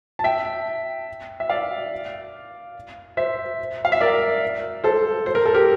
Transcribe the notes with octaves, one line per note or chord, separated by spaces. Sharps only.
A5
E5 G5
E5
D5 F5
C5 E5
F5
E5
A#4 D5
A4 C5
C5
A#4
A4
G4 A#4